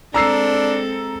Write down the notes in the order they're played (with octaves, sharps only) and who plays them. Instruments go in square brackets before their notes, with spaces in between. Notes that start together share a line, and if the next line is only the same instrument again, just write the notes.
[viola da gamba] G#3 C4 A4 [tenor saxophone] D4 [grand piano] A#5 E6 C7